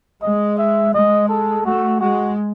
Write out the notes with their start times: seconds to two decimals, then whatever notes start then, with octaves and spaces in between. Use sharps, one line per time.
0.22 G#3 D#5
0.58 E5
0.93 G#3 D#5
1.29 A4
1.65 A3 F#4
2.00 G#3 F#4